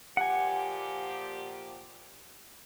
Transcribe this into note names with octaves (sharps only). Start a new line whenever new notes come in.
A#2 F3 G4 F#5 G#5